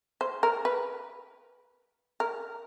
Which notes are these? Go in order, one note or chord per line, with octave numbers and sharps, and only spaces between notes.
C5
A#4
B4
A#4